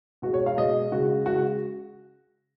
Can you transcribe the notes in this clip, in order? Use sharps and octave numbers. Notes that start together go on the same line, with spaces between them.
B2 G#3 F#4
C#5
F5
B2 G#3 D#5
C#3 G#3 F#4
C#3 G#3 F#4